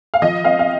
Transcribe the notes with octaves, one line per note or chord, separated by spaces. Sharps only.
F5
F3 D#5
C4 F5
F5